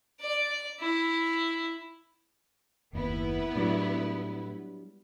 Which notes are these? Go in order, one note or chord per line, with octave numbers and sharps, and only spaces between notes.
D5
E4
F#1 D#2 B3 E4 B4
A2 F#3 G3 D4